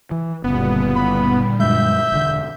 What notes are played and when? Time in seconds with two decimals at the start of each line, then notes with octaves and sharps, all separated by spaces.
0.11 E3
0.44 F#1 A#2 D3 G3 B3
0.96 B5
1.60 F#2 G#3 E5 G6
2.12 E1 D3